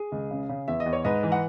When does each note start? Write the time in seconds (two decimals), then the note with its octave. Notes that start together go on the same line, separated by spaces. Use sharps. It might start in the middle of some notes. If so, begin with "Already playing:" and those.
Already playing: G#4
0.12 C#2
0.31 C#3
0.49 C#3
0.68 E2 E5
0.80 D#5
0.86 E2
0.93 C#5
1.05 G#2 B4 D#5
1.23 E3
1.32 F#5